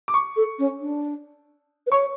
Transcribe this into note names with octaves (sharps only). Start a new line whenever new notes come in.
D6
C#6
A4
C#4
D4
B4
C#5 C#6